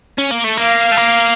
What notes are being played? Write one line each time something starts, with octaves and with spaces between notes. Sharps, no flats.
C#4
A#3
A3
A#3 F5
A3
A#3